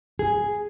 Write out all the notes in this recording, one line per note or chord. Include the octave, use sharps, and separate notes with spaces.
G#4